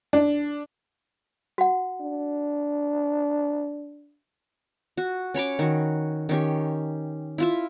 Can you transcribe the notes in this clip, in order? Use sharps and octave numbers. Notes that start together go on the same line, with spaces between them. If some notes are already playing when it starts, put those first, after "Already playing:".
D4
F#4 F#5
D4
F#4
C#4 C#5 B5 D6
D#3 F#4
D#3 C#4 G4
E4 F4 E5